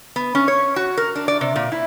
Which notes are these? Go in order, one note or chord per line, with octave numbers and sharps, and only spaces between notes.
B3
C#4
C#5
F#4
A#4
D4
D5
C3
A#2
E4